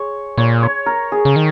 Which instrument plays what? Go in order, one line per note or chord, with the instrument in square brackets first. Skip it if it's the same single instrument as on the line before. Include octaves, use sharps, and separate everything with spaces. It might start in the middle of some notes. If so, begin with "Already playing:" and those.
Already playing: [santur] G#4 C#5
[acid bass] A#2 [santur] C#5
[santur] C#5
A#4
G#4
[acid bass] C#3
D#3